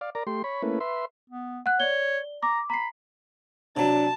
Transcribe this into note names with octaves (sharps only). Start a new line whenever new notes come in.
D5 F5
A#4 D5 A#5
A3 G4 C6
C#5 B5
A3 A#3 C#4 E4 B4
B4 E5 C6
B3
F#5 F#6
C#5 D5 G7
A#5 D6
A#5 B5 C7
C3 F#3 D4 A5